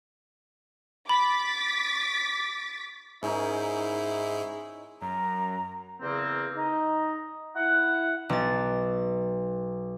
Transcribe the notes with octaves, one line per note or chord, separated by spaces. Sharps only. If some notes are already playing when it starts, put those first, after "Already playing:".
B5 D6 A6 B6
G#2 G#3 C#4 D#4 E4 A#4
F#2 A#5
E2 C#3 A#3 C4
D#4 D#5
E4 F#5
B1 A6